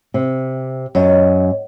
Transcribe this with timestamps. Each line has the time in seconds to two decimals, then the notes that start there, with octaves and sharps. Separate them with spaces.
0.14 C3
0.95 F#2 C#5 D#5